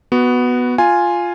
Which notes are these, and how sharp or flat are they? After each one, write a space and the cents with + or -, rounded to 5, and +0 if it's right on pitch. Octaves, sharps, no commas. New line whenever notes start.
B3 +0 F#4 +0
F4 +0 G#5 +0